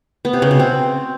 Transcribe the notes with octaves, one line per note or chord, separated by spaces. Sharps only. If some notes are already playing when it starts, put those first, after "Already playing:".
B3
C3
C#3
B2
C4